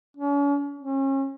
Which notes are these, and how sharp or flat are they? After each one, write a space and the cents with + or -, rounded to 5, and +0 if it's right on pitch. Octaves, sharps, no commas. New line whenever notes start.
C#4 +40
C#4 -35